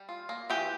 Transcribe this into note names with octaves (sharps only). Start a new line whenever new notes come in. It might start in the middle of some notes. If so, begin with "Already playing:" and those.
Already playing: G3
F4
A#3
E3 G4